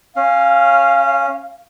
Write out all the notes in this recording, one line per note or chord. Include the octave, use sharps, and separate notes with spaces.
C#4 F5